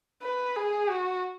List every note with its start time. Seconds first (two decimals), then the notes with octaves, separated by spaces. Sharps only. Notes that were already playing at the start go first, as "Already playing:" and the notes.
0.22 B4
0.56 G#4
0.90 F#4